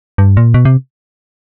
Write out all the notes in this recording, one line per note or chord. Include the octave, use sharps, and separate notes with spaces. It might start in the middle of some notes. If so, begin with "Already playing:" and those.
G2
A#2
B2
C3